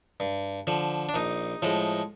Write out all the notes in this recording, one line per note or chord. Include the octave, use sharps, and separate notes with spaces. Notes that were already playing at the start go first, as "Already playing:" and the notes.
G2
D3 F3
D4
A#1 D#4
A2 F3 G#3